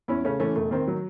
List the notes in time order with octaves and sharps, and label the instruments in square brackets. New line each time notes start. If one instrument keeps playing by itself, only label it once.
[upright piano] E2 C#4 E4
C#3 A3 C#4
E3 A3 C#4
E1 A3
D#3 C4
F#3